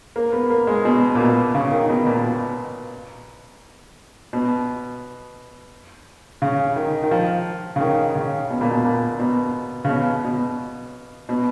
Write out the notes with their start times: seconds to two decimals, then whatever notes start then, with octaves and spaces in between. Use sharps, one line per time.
0.16 A#3
0.33 B3
0.50 A#3
0.67 G#3
0.85 B2
1.15 A#2
1.20 B2
1.54 C#3
1.72 D#3
1.90 B2
2.07 A#2
2.24 B2
4.33 B2
6.42 C#3
6.76 D#3
7.04 D#3
7.11 F3
7.76 C#3
7.81 D#3
8.15 C#3
8.50 B2
8.61 A#2
8.71 B2
8.85 A#2
9.20 B2
9.85 C#3
9.90 B2
10.24 B2
11.29 B2